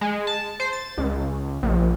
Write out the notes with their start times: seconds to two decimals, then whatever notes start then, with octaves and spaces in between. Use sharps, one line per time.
0.01 G#3
0.27 A5
0.60 C5
0.73 A6
0.98 C#2
1.63 A#1